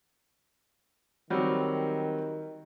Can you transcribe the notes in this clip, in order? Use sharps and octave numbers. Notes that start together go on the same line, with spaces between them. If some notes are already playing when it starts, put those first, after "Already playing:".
D#3 F#3 G3 C4